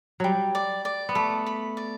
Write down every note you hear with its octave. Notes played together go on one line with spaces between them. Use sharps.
F#3 G3 G5
D5
D5
B3
A3 B5
B5
D5